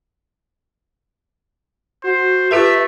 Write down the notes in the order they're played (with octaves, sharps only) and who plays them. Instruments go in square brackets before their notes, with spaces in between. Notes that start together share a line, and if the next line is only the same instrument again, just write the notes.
[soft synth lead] F#4 [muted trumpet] C5
[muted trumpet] A3 [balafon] F4 G4 A4 [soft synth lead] B4 [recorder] E5